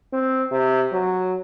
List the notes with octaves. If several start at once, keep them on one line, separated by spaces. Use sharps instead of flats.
C4
C3
F#3